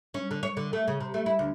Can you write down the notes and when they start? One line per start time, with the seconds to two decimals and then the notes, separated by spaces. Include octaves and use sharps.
0.14 C#4
0.31 D3
0.43 C#5
0.57 D3
0.73 A3
0.88 C#3
1.01 C3
1.14 A3
1.26 E4
1.39 D2